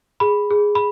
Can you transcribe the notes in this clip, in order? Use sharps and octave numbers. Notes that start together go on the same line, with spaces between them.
G#4 B5
G#4
B5